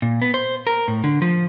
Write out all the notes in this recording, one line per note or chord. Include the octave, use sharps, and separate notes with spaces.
A#2
B3
C5
A#4
A2
D3
F3